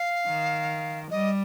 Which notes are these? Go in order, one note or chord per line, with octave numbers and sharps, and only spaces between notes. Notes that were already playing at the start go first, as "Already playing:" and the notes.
Already playing: F5
D#3
G3 D#5